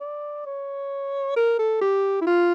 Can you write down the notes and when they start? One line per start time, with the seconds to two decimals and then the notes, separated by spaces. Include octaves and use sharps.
0.01 D5
0.46 C#5
1.36 A#4
1.59 A4
1.81 G4
2.22 E4
2.27 F4